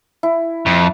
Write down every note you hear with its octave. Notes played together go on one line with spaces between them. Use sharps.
E4
F2